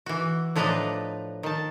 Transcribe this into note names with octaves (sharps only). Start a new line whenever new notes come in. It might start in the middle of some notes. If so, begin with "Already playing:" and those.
E3 F#4
A2 F3 D4 B4 D#5 A#5
D#3 A5